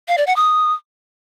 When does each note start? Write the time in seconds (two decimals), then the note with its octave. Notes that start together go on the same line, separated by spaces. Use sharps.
0.08 F5
0.18 D5
0.27 F#5
0.36 D#6